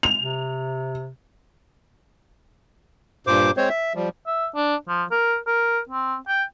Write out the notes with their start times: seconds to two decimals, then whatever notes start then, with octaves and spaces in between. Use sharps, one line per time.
0.03 F7
0.20 C3
3.27 G2 A#2 C5 D6
3.57 G#3 C4 C5 C#5
3.69 E5
3.95 F3 G3
4.27 E5
4.56 D4
4.88 F3
5.12 A#4
5.47 A#4
5.89 C4
6.28 G5